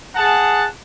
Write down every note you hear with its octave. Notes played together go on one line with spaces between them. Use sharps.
G#4 F#5 A5